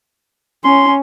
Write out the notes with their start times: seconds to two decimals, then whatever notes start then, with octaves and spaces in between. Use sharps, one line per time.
0.64 C#4 C6